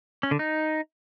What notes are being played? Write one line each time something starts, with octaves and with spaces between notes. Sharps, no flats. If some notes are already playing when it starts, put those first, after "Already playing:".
C#4
D3
D#4